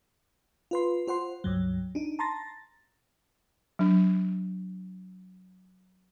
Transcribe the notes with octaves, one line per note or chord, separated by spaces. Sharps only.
F4 B4 C6
F4 C5 F#5 C6
C#2 G2 F#3
D4 D#4
A5 A#5 C6 A6 A#6
F#3 D4